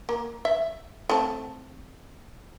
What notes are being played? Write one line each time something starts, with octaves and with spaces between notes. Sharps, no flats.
A#3
E5
A3 C4 A5